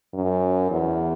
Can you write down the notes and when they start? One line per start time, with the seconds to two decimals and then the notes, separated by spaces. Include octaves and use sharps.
0.14 F#2
0.70 E2